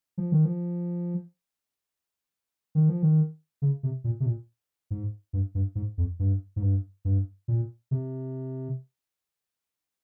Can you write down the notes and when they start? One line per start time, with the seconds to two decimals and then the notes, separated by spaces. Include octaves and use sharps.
0.18 F3
0.32 D#3
0.45 F3
2.75 D#3
2.89 F3
3.03 D#3
3.62 C#3
3.83 C3
4.04 A#2
4.20 C3
4.26 A#2
4.91 G#2
5.33 G2
5.55 G2
5.75 G#2
5.98 F2
6.19 G2
6.56 G#2
6.62 G2
7.05 G2
7.48 A#2
7.91 C3